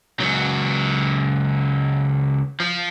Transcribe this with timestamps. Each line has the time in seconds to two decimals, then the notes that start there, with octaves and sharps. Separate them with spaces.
0.20 C#2 F#3
2.60 F3